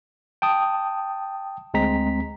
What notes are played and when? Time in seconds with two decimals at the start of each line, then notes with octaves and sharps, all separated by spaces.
0.42 G5 A5 D#6
1.74 D2 G#3 C4 A#5 B6